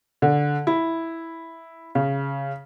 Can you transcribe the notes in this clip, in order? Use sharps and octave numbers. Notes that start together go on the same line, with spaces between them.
D3
E4
C#3